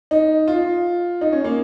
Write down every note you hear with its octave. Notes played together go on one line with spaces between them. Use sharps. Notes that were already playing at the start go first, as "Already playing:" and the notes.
D#4
F4
D#4
C#4
A#3